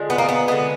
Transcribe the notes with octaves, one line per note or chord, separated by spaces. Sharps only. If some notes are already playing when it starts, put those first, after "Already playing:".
Already playing: D3 F3 G#3
B3
A#3
B3
D3 G#3 B3